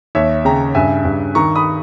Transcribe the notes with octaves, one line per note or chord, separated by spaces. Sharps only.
D#2 C#5 E5
C#3 G5 A#5
G2 E5 G#5
G2
D#3 A#5 C#6
B5 D#6